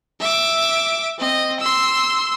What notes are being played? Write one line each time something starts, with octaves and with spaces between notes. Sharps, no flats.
E5 D6
C4 D#5
C6 E6